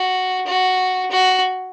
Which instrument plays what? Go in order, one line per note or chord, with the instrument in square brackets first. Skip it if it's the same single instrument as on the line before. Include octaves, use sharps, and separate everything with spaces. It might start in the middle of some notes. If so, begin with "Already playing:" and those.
Already playing: [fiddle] F#4
F#4
F#4